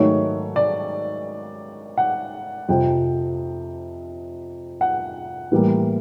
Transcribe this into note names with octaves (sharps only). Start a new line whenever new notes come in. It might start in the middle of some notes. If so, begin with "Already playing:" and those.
Already playing: G#2 D#3 F#3 A3 C#5
D5
F#5
F2 C3 F3 G5
F#5
A2 E3 G3 A#3